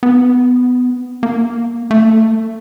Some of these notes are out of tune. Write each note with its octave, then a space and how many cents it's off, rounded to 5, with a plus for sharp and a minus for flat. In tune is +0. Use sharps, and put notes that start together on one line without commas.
B3 +15
A#3 +15
A3 +20